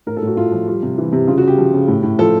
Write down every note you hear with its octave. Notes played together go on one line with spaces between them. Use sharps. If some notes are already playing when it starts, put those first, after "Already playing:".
A2 A#4
A4
A2 F#4
A2 F4
F3
G3 F4
C3
E3
C3
C#3 F4
F#4
C#3 G4
F3
C#3
A2
A2
F3 A4